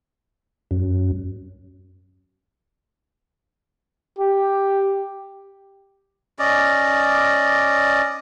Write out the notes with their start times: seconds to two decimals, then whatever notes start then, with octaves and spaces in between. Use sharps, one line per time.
0.71 F#2
4.19 G4
6.39 C#4 D5 D#5